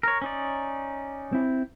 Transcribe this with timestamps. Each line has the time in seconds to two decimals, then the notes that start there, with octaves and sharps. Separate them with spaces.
0.03 A#4 C#5
0.22 C#4 D#4 D5
1.33 C4 E4